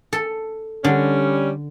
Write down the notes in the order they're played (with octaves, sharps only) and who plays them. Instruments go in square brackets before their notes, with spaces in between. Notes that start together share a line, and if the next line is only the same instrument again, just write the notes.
[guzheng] A4
[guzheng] D3 [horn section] G3 C#4